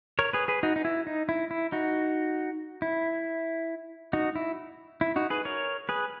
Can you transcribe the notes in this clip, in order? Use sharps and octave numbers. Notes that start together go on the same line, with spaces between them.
A#4 C#5
G#4 B4
G#4 B4
D#4 F#4
D#4
E4
D#4
E4
E4
D#4 F#4
E4
D#4 F#4
E4
E4
D#4 F#4
G#4 B4
A#4 C#5
G#4 B4